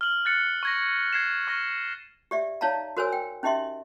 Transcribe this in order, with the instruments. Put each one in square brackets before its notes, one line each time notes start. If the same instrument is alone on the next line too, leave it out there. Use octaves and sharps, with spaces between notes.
[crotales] F6 F#7
F#6 A6 C#7
C#6 G#6 A#6
G#6 C7 E7
C#6 F6 A#6
[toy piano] G4 D5 E5
D#4 C#5 D5 F5 A5 A#5
F#4 A#4 C5 C#5 G#5 E6
G5
C#4 D#4 G4 D#5 E5 C6